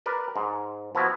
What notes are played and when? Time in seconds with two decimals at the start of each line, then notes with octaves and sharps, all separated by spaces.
0.06 A#4 B4 D5
0.36 G#2
0.95 F3 B3 E4 F#4